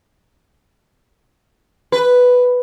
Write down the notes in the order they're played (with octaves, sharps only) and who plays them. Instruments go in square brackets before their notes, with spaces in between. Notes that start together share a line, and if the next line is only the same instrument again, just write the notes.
[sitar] B4